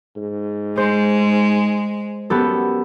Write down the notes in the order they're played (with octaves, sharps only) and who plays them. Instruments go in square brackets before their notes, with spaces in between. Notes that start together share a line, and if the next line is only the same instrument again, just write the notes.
[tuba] G#2
[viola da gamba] G#3 [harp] C5
[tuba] F#2 [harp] B3 G4 A4